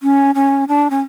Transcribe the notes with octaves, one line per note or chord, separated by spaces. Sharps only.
C#4
C#4
D4
C#4